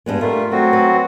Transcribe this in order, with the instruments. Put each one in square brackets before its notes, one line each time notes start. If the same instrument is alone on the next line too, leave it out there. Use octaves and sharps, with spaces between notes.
[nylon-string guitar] G2 G#3 B3
[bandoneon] G3 A3 F4 [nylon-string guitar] A#4
[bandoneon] F#3 C4 F#4 [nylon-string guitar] A3
[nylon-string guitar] B4